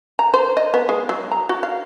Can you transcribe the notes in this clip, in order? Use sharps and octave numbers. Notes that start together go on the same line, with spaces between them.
A#5
C5
D#5
B3
G#3
F#3
A#5
F#4
F5